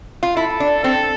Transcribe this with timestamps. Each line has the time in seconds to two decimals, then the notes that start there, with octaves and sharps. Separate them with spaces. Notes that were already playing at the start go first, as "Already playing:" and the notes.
0.23 F4
0.36 E4 A4
0.60 D4
0.84 C4 A4